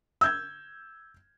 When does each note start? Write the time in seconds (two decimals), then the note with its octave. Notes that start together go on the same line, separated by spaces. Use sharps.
0.21 E6 G6 G#6